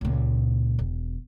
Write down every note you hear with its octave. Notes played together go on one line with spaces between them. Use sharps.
C#2 A#2
E1